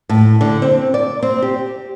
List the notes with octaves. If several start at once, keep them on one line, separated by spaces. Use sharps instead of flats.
A2
D3
C4
D5
C4
G4